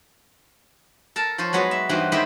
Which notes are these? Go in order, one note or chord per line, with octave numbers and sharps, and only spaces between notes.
A4 A#4 A5
F3 A4 C5 C#5 G#5
F#3 G#3 B3 F#4
E5
G2 E3 C4 D#4 F#4
D#3 G#3 E4 G4 D#5 E5